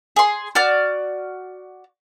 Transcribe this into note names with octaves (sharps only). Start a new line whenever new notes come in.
G#4 C6
F#4 D5 F6